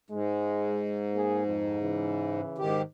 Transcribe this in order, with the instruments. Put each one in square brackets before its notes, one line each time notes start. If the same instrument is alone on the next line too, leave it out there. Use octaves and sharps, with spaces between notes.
[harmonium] G#2 [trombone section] G#3
[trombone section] A#3 G#4
F2
C#3 E3
[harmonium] G#2 D#3 G4